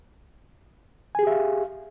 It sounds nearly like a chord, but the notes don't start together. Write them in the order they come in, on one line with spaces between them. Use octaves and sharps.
G#5 G#4 G4 E5 F5